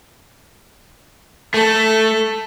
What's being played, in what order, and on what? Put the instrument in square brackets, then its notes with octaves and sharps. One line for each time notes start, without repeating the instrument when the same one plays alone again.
[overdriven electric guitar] A3 [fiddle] A4